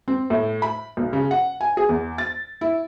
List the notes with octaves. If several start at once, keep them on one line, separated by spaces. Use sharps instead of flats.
C4
A2
B5
B1
C#3
F#5
G#5
G#4
E2
A6
E4